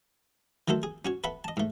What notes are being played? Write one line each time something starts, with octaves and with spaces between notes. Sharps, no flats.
D#3 F#3 A3 A4 C5
G#4
C#4 F#4 C#5
A4 B4 E5 F#5 B5
D#5 A5
G#2 A3